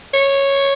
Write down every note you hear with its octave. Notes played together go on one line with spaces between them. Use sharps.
C#5